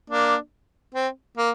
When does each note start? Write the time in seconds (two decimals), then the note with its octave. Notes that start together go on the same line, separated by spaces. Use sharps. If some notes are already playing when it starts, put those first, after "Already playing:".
0.10 A#3 D4
0.94 C4
1.37 A#3